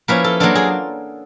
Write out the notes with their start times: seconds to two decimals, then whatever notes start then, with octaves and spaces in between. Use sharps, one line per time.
0.08 F3 A#3 C#4 E4 B4
0.24 A4
0.40 F#3 A#3 D4 F4 A4
0.55 G#4